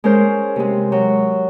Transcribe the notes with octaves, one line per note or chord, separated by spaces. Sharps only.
G#3 C#4 A#4 C5
C3 G#3
F#3